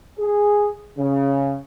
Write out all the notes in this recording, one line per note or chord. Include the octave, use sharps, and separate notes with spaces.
G#4
C#3